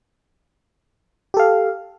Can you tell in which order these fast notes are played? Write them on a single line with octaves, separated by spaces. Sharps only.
G4 A4 F5